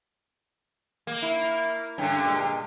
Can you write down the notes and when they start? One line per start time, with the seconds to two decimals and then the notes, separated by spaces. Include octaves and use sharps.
1.07 A#3
1.22 E4
1.98 G2 D3 C#4
2.25 A#2 G#3